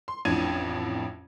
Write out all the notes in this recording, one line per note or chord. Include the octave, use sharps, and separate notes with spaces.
C6
A1 F2 A2 D4 G#6 D#7